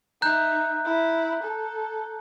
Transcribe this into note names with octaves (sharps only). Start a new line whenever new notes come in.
D#4 E5 A#5 F#6 G6
E4
A4